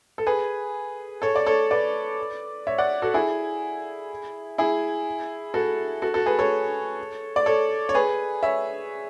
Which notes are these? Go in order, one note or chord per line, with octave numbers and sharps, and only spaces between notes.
A4
G#4 B4
A4 C#5
D5
A4 C#5
B4 D5
C#5 E5
D5 F#5
F#4 A4
E4 G#4
E4 G#4
F#4 A4
F#4 A4
F#4 A4
G#4 B4
A4 C#5
D5
A4 C#5
C#5
G#4 B4
C#5 E5